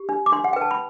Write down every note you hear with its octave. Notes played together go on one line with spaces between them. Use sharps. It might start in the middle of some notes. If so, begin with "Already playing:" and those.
Already playing: G4
D4
D6
D4 C6
F#5
B4 G5
A5
B5